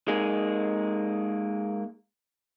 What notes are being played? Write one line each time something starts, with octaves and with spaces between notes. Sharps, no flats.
G#3 A#3 D#4 G#4